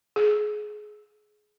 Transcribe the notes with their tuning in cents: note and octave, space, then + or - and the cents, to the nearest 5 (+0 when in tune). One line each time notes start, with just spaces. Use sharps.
G#4 +20